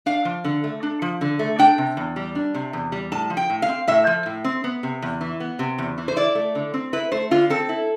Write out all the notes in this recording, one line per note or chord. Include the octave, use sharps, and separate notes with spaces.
D4 F5
F3
D3
A3
D4
F3
D3
A3
D4 G5
C3
E2
G3
D4
C3
E2
G3
A2 A5
F3
G5
A2
F5
C4
A2 E5
F3
A2
C4
B3
C3
E2
E3
B3
C3
E2
E3
C5
E4 D5
A3
D3
C4
E4 B4
A3 C5
D3 F4
C4 A4
E4